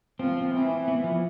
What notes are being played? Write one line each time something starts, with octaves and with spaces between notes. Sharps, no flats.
F3 C4
C4
E3 C4
C4
B3
F3